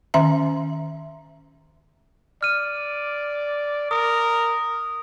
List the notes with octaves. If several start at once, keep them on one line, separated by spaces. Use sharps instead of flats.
D#3 C#4 E5 A#5
D5 F6 D#7
A#4 D#6